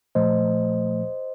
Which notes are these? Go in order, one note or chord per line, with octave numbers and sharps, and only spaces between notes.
A#2 F3 A3 C5 D#5